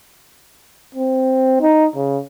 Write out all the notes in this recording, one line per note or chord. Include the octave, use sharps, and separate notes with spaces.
C4
D#4
C#3